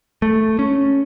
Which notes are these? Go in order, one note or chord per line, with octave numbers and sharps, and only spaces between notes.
A3
C#4